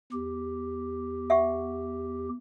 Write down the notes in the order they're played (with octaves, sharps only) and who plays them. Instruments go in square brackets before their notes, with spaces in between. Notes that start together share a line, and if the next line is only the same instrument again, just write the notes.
[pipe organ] E2 G4
[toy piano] E5 F#5 C#6